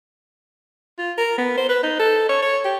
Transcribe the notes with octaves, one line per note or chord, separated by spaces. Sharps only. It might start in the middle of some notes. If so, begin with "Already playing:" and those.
F4
A#4
B3
C5
B4
D#4
A4
C#5
C#5
G4